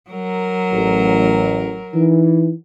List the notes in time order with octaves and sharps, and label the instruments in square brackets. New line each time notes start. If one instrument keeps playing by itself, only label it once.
[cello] F#3 A#4
[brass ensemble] A1
E3 D#4